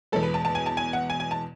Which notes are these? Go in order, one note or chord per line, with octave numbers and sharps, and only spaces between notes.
E2 B2 G#3 A4
B4
A5
A5
G#5
A5
G#5
F#5
G#5
G#5
A5